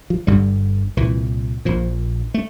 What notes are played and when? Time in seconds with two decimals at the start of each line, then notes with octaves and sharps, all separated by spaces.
0.10 F3
0.27 G1 G2 D3 G3
0.97 C2 A#2 E3
1.65 A#1 A#2 F3
2.34 A3